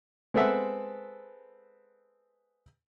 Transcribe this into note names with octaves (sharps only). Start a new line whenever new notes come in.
G#3 B3 C4 A4 E5 F#5